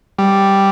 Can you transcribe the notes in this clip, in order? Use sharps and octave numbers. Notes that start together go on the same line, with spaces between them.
G3